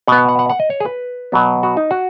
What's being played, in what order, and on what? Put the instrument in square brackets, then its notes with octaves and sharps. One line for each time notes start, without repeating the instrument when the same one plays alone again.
[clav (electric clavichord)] B2 F#5
B3
F#5
F#5
F#5
F#5
D#5
C#5
G#4
B4
B2 F#3 B3
F#4
D#4
F#4